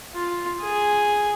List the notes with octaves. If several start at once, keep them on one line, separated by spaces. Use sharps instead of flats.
F4
G#4